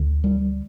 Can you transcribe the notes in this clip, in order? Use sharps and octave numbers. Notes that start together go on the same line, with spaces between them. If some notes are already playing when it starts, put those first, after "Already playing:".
Already playing: D2 D3
G3